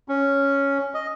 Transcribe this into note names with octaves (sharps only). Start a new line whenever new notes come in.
C#4
D#5